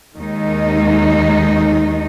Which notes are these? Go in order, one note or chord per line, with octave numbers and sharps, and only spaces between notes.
D#2 D#3 G#3 D#4